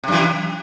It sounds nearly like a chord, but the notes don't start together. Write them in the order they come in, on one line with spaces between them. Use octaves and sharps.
C3 F#2 E3